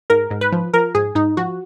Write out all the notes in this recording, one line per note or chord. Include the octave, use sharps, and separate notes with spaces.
G#2 A#4
G#2
B4
F3
F3 A#4
G#2 G#4
G#2 D#4
F3 F#4